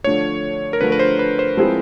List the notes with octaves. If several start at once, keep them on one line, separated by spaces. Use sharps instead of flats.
D3 F3 A3 D4 C#5
A#4
D3 F3 A3 D4 B4
B4
C5
B4
C5
F3 G#3 C4 E4 G#4